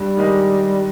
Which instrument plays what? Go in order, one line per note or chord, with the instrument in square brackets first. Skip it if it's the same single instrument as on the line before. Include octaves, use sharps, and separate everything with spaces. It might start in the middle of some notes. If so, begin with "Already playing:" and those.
Already playing: [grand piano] G2 [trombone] G3
[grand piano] D#3 G#3 D#4 G4